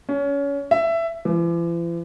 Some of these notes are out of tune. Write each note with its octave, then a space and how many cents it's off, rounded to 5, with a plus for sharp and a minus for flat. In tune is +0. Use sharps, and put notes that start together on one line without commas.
C#4 +25
E5 +15
E3 +45